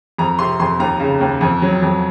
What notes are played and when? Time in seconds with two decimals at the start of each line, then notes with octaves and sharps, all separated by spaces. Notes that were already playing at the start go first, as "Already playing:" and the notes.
0.18 F2 A#5
0.39 C3 C6
0.60 F2 C6
0.79 D#2 A#5
1.00 C#3
1.21 D#2
1.41 F2
1.62 F#3
1.82 F2